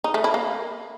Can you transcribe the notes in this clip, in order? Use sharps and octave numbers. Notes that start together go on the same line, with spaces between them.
D#4
A3
E4
A#3